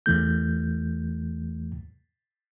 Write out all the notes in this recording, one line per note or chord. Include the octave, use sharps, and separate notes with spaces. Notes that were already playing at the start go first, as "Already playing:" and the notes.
E2 E3 A3 G6